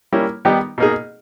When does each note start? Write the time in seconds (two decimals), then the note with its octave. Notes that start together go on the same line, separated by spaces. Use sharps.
0.12 G3 A#3 C#4 E4
0.45 D#3 G3 B3 D#4 G4
0.78 B2 A#3 D#4 G#4